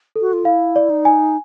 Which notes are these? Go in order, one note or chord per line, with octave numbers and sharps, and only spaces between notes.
A4
F#4
F4
E4 F5
D5
D#4
G#5